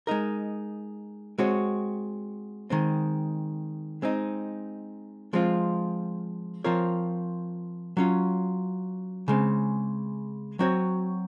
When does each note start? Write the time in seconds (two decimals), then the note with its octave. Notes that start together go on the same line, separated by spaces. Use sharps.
0.07 G#3 D#4 A#4
1.38 G#3 C4 F#4 C#5
2.70 D#3 G#3 C4
4.02 G#3 C4 D#4
5.33 F3 G#3 C4 F4
6.64 F3 C4 F4 A#4 C#5
7.97 F#3 C#4 F4
9.28 C#3 G#3 C4
10.59 F#3 C4 F#4 C#5